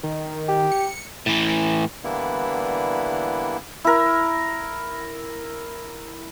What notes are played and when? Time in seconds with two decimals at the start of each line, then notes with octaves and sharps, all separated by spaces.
0.03 D#3
0.48 G4
0.72 C#7
1.26 A2 E3
2.04 D3 E3 G3 A#3 B3 E4
3.85 E4 A#4